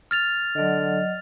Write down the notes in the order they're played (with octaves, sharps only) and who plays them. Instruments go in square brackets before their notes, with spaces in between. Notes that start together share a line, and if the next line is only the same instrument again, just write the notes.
[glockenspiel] F6 A6 F7
[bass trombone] D3 [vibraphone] F#3 D5 D#5